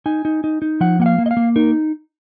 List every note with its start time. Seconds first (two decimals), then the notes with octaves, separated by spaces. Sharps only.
0.06 D#4 G#5
0.25 D#4
0.44 D#4
0.62 D#4
0.81 F3 F#5
1.00 A#3 F#5
1.06 F5
1.18 A#3
1.26 D#5
1.31 F5
1.37 A#3
1.56 D#4 A#4